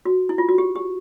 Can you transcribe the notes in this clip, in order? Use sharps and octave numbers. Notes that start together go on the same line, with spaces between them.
F#4
E4
F4
F#4
G4
G4